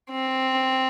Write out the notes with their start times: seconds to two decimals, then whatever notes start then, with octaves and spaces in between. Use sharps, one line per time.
0.10 C4